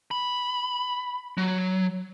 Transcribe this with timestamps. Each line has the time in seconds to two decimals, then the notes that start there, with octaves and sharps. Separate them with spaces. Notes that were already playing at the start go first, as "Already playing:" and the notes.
0.11 B5
1.38 F#3